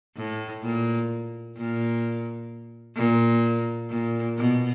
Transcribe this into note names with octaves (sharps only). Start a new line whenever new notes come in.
A2
A#2
A#2
A#2
A#2
B2